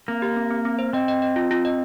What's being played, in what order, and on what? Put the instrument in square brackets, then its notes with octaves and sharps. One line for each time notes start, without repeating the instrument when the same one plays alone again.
[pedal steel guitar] A#3 [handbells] C4
[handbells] G4
C4
C4
C4
C5
[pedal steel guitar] C4 [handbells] D#5
[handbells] D#5
D#5
F4
F4
D#5